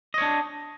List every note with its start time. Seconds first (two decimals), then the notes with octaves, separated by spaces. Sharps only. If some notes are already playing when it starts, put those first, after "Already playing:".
0.14 D#5
0.18 C#5
0.22 D4